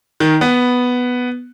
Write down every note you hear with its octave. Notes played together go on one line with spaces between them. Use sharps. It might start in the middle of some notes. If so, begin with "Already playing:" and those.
D#3
B3